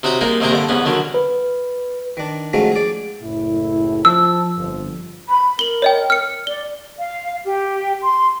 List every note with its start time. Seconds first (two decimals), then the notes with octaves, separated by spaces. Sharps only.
0.03 C3 D#4 F#4 C#5 A#5 B5
0.21 G3 G#3 A#3 D#4
0.40 D#2 C3 G#3 A#3 G4 A#5
0.52 G2 D3 D6
0.69 E2 G#2 B3 C#4
0.85 D3 D#3 F#3 C#4
1.14 B4
2.17 D#3 D4
2.53 D#3 F3 F#3 G#3 A3 C#4
2.72 G#4 D5
3.22 F#1 A2 E4
4.05 F3 A5 E6
4.57 G1 F2 F3
5.29 B5
5.59 A#4 F#7 G7
5.82 C#5 D#5 G5
6.10 F6 C#7
6.47 D5 G7
6.99 F5
7.45 G4
8.02 C6